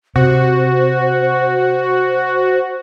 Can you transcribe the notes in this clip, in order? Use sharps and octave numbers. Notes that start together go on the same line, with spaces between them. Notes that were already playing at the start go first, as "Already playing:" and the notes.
C3 F#4 C5